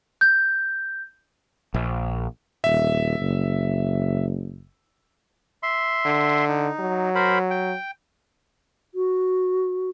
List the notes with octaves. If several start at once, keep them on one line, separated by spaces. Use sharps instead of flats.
G6
A#1
D#1 E5
F#1
E5 C6
D3
D#4
F#3
A#4 C5 B5
G5
F#4